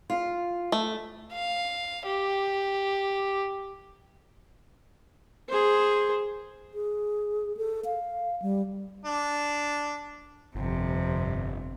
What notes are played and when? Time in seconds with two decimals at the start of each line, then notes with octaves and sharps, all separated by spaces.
0.10 F4
0.72 A3
1.33 F5
2.06 G4
5.48 G#4 C5
6.74 G#4
7.57 A4
7.85 F5
8.42 G3
9.05 D4
10.55 G1 F2 C3